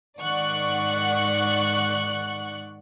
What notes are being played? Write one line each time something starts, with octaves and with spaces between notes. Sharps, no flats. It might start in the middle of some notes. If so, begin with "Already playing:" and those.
G#2 D#3 D5 F#5 C#6 F#6